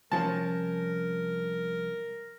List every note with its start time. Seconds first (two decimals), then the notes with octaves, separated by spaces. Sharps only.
0.12 C2 F3 C#4 A#4 A5